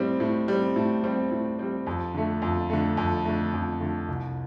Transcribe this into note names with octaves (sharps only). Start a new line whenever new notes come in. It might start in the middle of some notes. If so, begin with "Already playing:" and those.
Already playing: A2 G3 C4
A2
G3 C4
A2
G3 C4
A2
G3 C4
F2
D3 A3
F2
D3 A3
F2
D3 A3
F2
D3 A3
C2